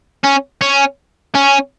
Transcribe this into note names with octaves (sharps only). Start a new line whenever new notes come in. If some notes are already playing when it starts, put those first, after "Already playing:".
C#4
C#4
C#4